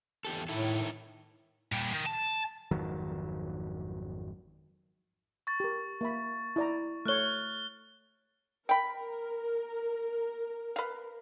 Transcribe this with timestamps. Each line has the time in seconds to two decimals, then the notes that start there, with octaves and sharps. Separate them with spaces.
0.25 E2 G4 A4
0.49 A2 D#3 E4 A4
1.72 A#2 G3
1.93 D#3
2.06 A5
2.71 G#1 F2 D#3 F#3
5.47 C#6 A6
5.60 G4 A#4
6.01 A#3 E5 B5
6.56 E4 D5 A#5
7.06 A3 C#5 F6 F#6 G7
8.69 A#4 G5 B5
10.76 B4 F5